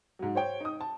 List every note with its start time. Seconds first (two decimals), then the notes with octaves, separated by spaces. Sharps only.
0.19 G#2 F#3
0.35 C5 C#5 G5
0.60 D#4 D#6
0.81 A5